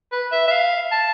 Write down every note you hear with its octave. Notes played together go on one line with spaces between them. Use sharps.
B4
E5
E5
F5
A5